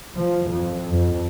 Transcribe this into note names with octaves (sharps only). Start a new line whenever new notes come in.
F3
F2
F2